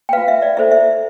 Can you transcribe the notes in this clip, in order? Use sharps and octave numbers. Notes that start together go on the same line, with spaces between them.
G5
F4 B4 F5
E5
D5
E4 A4 C5 E5
E5